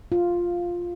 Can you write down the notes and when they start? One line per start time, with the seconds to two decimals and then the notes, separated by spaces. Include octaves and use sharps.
0.12 F4